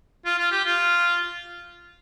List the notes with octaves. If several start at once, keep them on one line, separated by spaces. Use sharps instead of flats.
F4
F4
G4
F4